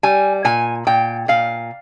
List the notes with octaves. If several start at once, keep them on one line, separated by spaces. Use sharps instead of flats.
G3 G#5
A#2 G#5
A#2 G5
A#2 F5